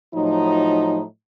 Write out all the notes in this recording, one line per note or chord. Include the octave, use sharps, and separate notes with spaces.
A2 F3 F#3 D#4